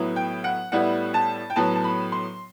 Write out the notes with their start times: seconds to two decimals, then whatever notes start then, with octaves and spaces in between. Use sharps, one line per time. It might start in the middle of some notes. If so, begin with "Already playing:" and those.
Already playing: A2 F#3 B3 E4
0.16 G5
0.44 F#5
0.72 A2 G3 B3 E4 F#5
1.14 A5
1.50 G5
1.56 A2 F#3 B3 A5
1.75 A5
1.84 B5
2.12 C6